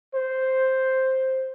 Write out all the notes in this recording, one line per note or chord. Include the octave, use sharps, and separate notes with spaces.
C5